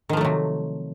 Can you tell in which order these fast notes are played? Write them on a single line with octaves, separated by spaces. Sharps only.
D#3 F3 A3 F#3 C3